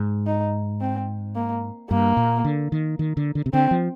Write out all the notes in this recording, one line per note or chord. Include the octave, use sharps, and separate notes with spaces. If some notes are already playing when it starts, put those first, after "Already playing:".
Already playing: G#2
D#4
C4
A#3
G2 A#3
A#2
D3
D#3
D#3
D3
D3
C3
D3 C4
F3